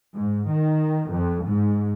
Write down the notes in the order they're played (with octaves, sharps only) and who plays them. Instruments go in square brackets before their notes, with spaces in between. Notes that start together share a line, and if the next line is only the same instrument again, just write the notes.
[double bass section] G#2
D#3
F2
G#2